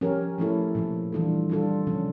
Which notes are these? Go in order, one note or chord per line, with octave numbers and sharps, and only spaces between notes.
F3 C#4 G4 A#4
F3 A3 C#4 E4 A4
A#2 F3 A#3
E3 G3 D4 F4 A4
G3 D4 F4 A4
C#3 F3 C#4